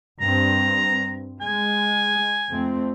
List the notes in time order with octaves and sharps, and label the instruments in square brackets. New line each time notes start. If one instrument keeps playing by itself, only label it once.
[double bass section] G2 C4 [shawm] A#5
[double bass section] G#3 [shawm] G#5
[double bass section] F2 A3 C4